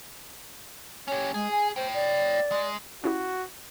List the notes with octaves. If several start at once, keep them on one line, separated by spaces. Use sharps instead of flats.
C#4 G4 C#5
G#3 G#4
G#5
C5 C#5 G5
D5
G#3
C#4 E4 F#4 G4